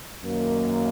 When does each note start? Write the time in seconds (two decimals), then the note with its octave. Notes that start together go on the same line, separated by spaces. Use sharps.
0.23 F#2 D#3 A#3